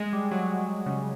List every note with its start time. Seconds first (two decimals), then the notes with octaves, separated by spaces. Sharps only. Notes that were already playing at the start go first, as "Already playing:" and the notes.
Already playing: G#3
0.13 G3
0.31 F#3
0.86 C#3